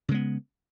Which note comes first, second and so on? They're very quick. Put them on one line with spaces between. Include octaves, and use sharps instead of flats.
C#3 G#3 B3